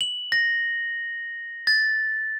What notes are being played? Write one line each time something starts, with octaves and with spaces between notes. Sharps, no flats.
F#7
A#6
A6